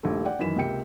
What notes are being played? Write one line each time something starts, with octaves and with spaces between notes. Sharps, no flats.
A#1 D#2 G3 A3
D5 F#5 G5
F#2 D#3 E3 B6 E7
C#2 C3 A#3 G5 C#7